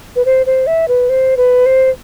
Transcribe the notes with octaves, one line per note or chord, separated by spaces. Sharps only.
B4
C5
C5
E5
B4
C5
B4
C5